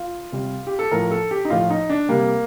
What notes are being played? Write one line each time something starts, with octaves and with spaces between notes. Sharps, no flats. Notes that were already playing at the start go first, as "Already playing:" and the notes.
Already playing: F4
C3 G3
G4
A4
A2 F3 A#4
A4
G4
D#4
A2 F3 F4
D#4
D4
C3 G3 A#3